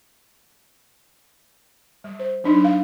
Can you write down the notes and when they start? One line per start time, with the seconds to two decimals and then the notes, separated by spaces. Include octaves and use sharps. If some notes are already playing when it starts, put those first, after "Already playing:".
2.04 G3
2.19 C5
2.44 F#3 D4 D#4
2.64 F5